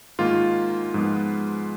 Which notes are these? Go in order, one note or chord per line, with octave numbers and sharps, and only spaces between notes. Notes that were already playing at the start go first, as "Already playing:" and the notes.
G#2 D#3 A#3 F4
G#2 F3 G#3 B3